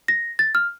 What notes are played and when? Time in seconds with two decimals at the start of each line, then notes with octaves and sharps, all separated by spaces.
0.08 A#6
0.39 A6
0.55 F6